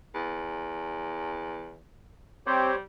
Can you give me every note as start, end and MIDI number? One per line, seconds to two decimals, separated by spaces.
0.15 1.79 40
2.47 2.82 55
2.47 2.72 60
2.47 2.76 67
2.47 2.76 72
2.47 2.76 73